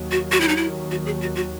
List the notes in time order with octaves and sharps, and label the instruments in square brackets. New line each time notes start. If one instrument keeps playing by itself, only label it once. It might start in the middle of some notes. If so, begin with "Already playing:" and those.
Already playing: [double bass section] D#2 D#3 F#3
[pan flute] F#4
F#4
E4
D#4
E4
F#4
G#4
F#4
F#4